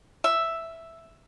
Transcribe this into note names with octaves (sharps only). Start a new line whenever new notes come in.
E5